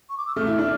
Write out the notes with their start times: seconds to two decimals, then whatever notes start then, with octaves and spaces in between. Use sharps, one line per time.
0.10 C#6
0.18 D6
0.27 E6
0.36 A3 F6
0.47 E4
0.59 D4